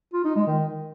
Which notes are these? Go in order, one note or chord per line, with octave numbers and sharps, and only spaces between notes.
F4
D#4
G#3
D#3